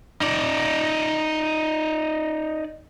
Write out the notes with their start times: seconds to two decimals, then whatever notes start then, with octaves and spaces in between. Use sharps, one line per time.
0.21 D#4 D5